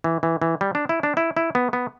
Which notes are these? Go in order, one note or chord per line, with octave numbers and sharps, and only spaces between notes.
E3
E3
E3
G3
D4
E4
D4
E4
E4
B3
B3